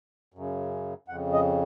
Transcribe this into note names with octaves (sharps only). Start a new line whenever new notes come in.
F#2 C#3
F2 C#3 F#5
D#5